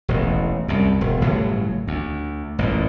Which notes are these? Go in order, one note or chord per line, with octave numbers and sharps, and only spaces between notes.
E1 A1 E2
C2 F#2
E1
G1 A2 C#3 F#3
D2
A1 F#2 A#2